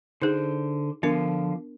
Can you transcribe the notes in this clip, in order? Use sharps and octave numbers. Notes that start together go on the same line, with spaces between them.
D3 D#4 G#4 C5 G6
D3 F3 B3 D4 A#4